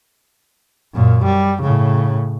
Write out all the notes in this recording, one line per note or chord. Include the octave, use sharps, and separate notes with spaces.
F#2 A#2
G3
A2 C#3